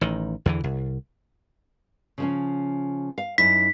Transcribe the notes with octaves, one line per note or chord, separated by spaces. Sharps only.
A1 D#3
E2 D3 E3
C2
C#3 F3 C#4
F5
F#2 D#4 E4 B6